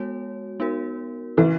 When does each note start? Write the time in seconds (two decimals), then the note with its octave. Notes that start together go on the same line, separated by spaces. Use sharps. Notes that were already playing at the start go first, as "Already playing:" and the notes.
Already playing: G#3 B3 F#4 C#5
0.60 B3 D#4 F#4 A#4
1.37 E3 C#4 E4 B4